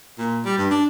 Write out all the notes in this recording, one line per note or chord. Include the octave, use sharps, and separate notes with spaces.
A#2
G3
G2
D4